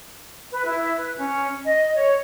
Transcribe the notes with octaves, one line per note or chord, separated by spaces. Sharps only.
B4
E4
B4
C#4
D#5
C#5